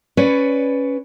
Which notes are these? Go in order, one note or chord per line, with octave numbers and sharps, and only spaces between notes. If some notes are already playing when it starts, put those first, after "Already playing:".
C#4 B4 C#5 D5